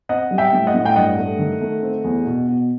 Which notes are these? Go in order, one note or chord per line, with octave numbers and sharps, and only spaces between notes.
C4 D#5 F#5
G3
E5 G5
A2
D#5 F#5
A2
G5
G2 D#5 F#5
A3
D#3
A3
C4
E2
B2
B2